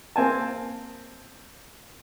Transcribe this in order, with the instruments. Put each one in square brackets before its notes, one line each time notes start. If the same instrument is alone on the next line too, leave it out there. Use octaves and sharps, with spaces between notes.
[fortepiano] A#3 C4 G#5 A5